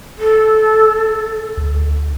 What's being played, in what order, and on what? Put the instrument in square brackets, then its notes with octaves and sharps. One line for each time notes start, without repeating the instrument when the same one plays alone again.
[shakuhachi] A4
[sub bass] D2